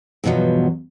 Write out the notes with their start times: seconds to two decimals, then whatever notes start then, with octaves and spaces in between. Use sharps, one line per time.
0.24 E2 G2 B2 F3 F#3